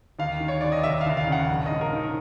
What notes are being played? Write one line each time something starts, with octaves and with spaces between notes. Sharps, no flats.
D#2 F5
D#3
C#5
D#2 D5
D#5
F1 E5
F5
D#2
F5
C#3
F#5
A#1
D#5
G#2
A#4
D#3